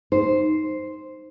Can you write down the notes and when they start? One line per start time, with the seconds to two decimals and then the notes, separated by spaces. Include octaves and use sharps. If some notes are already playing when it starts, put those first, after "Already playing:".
0.12 D#4 C5